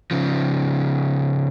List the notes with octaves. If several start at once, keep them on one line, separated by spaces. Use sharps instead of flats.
C#3 F3